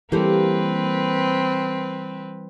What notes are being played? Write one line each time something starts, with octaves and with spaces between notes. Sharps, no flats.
E3 G3 A#3 C4 G4 A4 B4